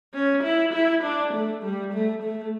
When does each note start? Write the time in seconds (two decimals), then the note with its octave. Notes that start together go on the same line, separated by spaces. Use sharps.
0.14 C#4
0.43 E4
0.74 E4
1.04 D4
1.34 A3
1.63 G3
1.93 A3
2.23 A3